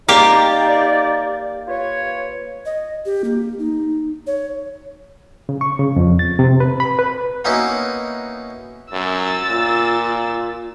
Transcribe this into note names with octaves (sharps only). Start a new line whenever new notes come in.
A#3 D#4 G4 D5
F4 B4 C#5
D#5
G4
A#3
D#4
C#5
C#3
C#6
C#3
F2
A6
C3
B4
B5
B4
A#3 B3 C#4 D#4 E4 F#4
F#2 E6 A6
A#2 F4